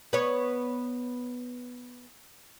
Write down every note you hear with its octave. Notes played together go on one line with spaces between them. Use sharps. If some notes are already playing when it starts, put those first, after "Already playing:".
B3 C#5